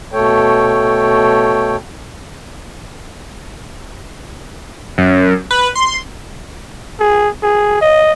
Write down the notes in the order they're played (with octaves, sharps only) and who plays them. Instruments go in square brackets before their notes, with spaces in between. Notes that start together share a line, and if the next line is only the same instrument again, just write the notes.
[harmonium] B2 A3 A4 C#5 G5
[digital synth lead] F#2
B4
C6
[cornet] G#4
G#4
D#5